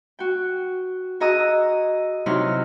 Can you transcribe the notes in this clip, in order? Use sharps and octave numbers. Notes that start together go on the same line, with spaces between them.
F#4 G5
F#4 G#4 D#5 A#5 D#6 E6
C3 F#3 C4 D#4 E4 F6